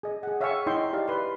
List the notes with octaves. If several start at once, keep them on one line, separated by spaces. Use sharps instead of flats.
G#4 D#5
G#4 F#5
C#5 E5 F5 G5 G#5 C#6
D#4 E4 D#5 G5 C6
G4 D5 F5
B4 C6